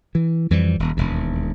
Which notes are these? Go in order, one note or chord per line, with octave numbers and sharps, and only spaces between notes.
E3
F2 E3 F3 G3
D#1
E1 D#2